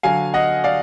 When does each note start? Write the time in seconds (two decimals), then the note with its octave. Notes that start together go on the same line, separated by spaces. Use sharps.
0.03 D3 F#3 F5 G#5
0.34 D#5 F#5
0.64 D5 F5